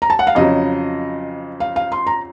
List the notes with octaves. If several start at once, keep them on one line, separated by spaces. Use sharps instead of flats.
A#5
A5
F#5
F5
F2 C#3 F#3 D#5
F5
F5
C6
A#5